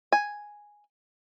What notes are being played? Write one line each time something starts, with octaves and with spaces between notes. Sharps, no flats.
G#5